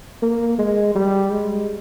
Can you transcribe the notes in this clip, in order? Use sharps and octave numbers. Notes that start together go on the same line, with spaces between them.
A#3
G#3
G3
G#3